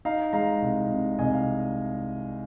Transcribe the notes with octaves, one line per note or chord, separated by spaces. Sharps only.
D#4 F5 A#5
G#3 F5 A#5
C2
C3
C2 D#5 G#5
F5